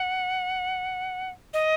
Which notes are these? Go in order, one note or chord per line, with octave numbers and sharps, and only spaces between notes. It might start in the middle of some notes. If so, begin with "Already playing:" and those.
Already playing: F#5
D#5